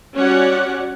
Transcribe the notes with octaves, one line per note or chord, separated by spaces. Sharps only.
G3 C#4 F#4 C#5 D5 F#5